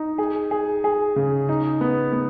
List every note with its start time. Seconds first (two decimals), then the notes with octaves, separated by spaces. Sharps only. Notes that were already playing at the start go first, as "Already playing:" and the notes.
Already playing: D#4
0.18 G#4
0.51 G#4
0.84 G#4
1.16 C#3
1.49 D#4
1.81 B3
2.13 B3